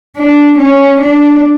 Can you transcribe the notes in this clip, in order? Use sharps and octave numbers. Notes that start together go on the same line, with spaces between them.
D4
C#4
D4